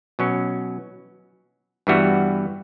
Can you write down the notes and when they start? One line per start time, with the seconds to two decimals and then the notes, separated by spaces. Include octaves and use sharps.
0.19 B2 F#3 C#4
1.87 G2 E3 G3 B3 F#4